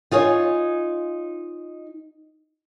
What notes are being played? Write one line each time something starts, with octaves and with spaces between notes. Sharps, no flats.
D#4 F4 G#4 C#5